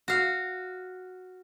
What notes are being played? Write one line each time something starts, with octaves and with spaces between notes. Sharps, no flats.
F#4 F5